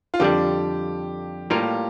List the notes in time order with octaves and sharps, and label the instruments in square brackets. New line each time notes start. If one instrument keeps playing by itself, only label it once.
[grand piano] F4
[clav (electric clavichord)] F2 D3 G3 D4 [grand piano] G4
[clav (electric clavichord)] A2 G3 A#3 F4 A#4 [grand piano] G4